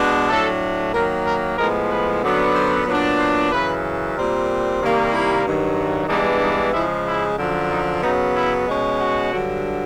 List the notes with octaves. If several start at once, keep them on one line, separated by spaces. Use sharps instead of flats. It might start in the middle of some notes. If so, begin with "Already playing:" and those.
Already playing: B2 G#3 B3 D4
A2 F#3 A3 D4 A4
D#3 F#3 A#3 A#4
A#4
A2 F3 G#3 B3 A#4
B4
F#2 D3 F#3 B3 D4
C5
A#2 F#3 B3 D4
C5
F#2 C#3 E3 B4
A#2 G3 C4 A#4
C3 D#3 G3 A#3
E4
G2 D#3 F#3
G2 E3 G#3 B3 D4 D#4
D#4
C#3 F3 G#3 E4
E4
F#2 D3 F3
D#4
F#2 C#3 F#3 B3 D#4
E4
B2 G#3 C#4
F#4
G2 D3 F#3